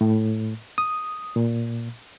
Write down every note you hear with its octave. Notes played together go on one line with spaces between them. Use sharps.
A2
D#6
A#2